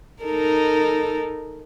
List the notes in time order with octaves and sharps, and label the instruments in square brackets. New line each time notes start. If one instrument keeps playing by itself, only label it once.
[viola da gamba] D#4 A4 A#4